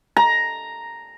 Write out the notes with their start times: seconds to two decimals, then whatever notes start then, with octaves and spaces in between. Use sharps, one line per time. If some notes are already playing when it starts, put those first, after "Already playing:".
0.16 A#5